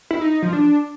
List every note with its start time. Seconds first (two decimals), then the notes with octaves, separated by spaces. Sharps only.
0.11 E4
0.21 D#4
0.32 D#4
0.42 F3
0.53 D4